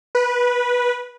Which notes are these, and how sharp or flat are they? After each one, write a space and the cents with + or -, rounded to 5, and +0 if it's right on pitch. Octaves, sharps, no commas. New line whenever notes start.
B4 -15